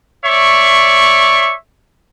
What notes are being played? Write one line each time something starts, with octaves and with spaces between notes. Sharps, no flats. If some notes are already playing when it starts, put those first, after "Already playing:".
C#5 D5 E5 C#6